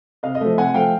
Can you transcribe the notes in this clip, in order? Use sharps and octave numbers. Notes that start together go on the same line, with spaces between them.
C3 D#5 F5
D#5
F3 A3
C3 F#5 G#5
F3 A3 F5 G5